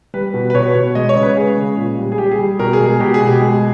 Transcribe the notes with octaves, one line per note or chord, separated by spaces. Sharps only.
G3 B4
B2
B4
B2 C#5
B2
G#3 D#5
C#5
C#3
B4
G#3 G#4
C#3
A#2
G3
G#4
G3 G4
G#4
G3
B2 A#4
G#4
G#3
G#4
B2 G4
G#4
B2
G4
G#3 G#4